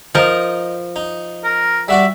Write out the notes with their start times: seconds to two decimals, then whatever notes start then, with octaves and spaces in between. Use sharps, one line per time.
0.15 F3 D#4 A#4 D#5
0.96 D#4
1.44 A#4
1.88 G3 F#4 D5 E5